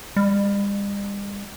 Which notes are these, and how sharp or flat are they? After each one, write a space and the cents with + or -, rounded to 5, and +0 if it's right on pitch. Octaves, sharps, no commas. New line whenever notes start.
G3 +45